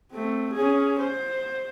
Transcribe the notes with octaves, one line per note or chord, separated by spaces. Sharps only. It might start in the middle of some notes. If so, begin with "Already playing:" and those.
A3 C4
C#4 G#4
C5